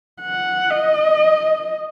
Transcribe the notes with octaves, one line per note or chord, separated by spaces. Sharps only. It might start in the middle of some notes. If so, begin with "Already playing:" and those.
F#5
D#5